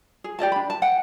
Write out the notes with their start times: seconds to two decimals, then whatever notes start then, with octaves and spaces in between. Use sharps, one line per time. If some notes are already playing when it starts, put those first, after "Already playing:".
0.24 G#4
0.39 G4 D5 D#5 A5
0.52 D4 B5
0.70 A5
0.82 F#5 G5